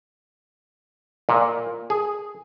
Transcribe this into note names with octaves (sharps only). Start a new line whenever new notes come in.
A#2
G#4